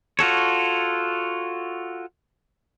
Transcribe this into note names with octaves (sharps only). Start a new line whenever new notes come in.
F4 F#4 A4 C#5